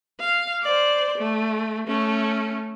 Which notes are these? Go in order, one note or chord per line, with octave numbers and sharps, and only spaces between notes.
F5
C5 D5
A3
A3 C#4